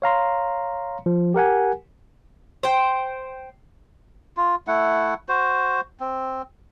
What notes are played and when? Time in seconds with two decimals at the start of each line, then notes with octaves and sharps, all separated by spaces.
0.02 C#5 F5 A#5 C6
1.06 F3
1.34 G4 A#4 F#5 G#5
2.63 C5 G5
4.37 F4
4.67 A3 E4 F#5
5.28 F#4 C5
6.00 C4